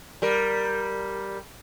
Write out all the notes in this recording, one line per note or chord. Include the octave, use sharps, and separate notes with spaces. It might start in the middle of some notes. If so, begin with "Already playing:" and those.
G3 A#4